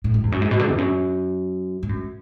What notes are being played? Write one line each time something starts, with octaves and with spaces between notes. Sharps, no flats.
A2
G#2
E2
F#2
G#2
B2
D3
E2
F#2
G#2
F#2